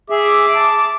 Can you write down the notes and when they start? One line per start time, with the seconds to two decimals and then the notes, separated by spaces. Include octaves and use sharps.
0.10 G#4 E5 D6
0.55 A5